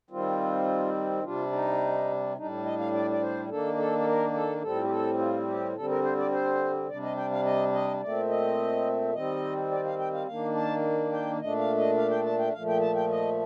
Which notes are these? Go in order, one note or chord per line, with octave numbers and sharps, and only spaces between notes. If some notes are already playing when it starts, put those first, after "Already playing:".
D#3 G3 C4 F4
C3 G3 D4 F4
D#4
A2 G3 D4 D#4
D#5
F5
D5
D5
C5
D#3 A#3 D4 A4
A4
A4
A#4
A4
A2 G3 C4 A4
F4
G4
A4
F4
G4
D3 G3 C4 A4
A#4
C5
D5
C5
C3 G3 D4 D5
D#5
G5
F5
D#5
D#5
A#2 A3 C4 D5
D#5
D#3 G3 C4 D#5
D5
F5
G5
F5
D#3 A#3 D4 F5
A5
G5
A#2 A3 D4 D#5
F5
D#5
F5
G5
A5
G5
A#2 F3 A3 F5
G5
A5
G5
D#5